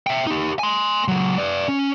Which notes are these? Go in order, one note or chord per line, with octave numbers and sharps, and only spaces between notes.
E5 G5
D#4 G4
G#5 C6
C#2 F#3
B4 D5
C#4